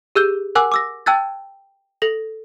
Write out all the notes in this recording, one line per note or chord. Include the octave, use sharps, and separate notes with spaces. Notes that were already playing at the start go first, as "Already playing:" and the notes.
G4 G#4 E6 F#6 G6 G7
A#4 F#5 G#5 D6 E6 F#6
D6 E6 A#6
G5 A5 E6 F#6 G#6 A6
A4 A#6 F#7